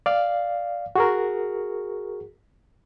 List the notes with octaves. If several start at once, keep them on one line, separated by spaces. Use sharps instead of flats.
D5 F5
F#4 G#4 A#4